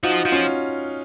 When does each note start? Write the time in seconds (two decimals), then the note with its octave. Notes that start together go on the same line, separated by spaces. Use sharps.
0.03 F3 D#4 F#4
0.25 F3
0.32 C#4 F4